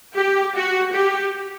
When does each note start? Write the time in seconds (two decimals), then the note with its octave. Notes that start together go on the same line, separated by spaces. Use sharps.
0.15 G4
0.55 F#4
0.94 G4